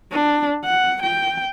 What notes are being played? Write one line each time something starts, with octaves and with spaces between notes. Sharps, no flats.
D4
F#5
G5